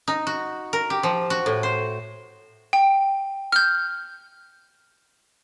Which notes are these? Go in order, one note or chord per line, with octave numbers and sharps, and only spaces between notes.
D#4
F#4
A#4
G4
F3
F#4
A2
C5
G5
F6 G6